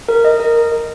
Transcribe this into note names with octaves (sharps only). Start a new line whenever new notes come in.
A#4
D#5
A#4
A#4
A#4